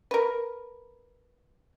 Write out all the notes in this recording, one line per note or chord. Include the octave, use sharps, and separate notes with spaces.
A#4 B4